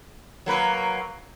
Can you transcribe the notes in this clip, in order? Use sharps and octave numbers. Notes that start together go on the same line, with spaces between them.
F#3 A#3 B4